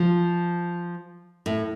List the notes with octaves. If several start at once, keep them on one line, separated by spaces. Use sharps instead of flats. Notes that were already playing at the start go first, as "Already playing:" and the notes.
Already playing: F3
A2